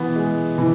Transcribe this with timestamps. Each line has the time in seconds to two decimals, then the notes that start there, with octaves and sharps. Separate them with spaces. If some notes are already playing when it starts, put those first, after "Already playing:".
Already playing: E3 B3
0.16 G#3
0.58 E3